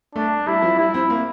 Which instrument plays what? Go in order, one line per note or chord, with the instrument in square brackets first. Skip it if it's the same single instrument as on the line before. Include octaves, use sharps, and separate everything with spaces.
[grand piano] A3 [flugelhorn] D4
[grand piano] G3 [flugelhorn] E4
[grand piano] F3
[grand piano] G3 [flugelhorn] E4
[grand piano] C4
A#3